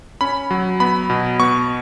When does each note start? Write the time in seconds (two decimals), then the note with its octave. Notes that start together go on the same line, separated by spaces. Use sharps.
0.21 C#4 B5
0.51 F#3
0.80 B3 B5
1.10 B2
1.40 B3 C#6